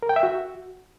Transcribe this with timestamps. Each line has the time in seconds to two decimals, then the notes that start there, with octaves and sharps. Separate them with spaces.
0.03 A#4
0.09 G5
0.16 E5
0.23 F#4